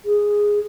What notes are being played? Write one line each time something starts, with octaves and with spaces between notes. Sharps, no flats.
G#4